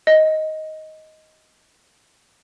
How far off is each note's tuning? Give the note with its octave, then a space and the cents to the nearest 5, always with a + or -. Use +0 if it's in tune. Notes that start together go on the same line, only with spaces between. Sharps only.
D#5 +10